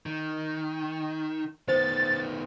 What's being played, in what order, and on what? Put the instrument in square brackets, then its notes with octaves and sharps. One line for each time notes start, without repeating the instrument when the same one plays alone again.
[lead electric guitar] D#3
[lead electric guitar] D#3 B3 [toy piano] C5 [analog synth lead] A6